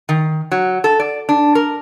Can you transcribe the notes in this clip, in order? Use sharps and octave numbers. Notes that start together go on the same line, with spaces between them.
D#3
F#3
A4
D5
D4
A#4